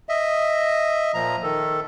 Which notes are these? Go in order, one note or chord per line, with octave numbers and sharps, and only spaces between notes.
D#5 E5
A#2 F3 A#5
D#3 A4